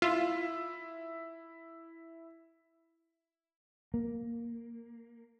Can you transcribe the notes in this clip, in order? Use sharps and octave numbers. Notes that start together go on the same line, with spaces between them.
E4 F4
A#3